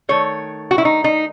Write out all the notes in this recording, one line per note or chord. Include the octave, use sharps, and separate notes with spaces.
D#3 A3 C#5
F#4
E4
D#4
D#4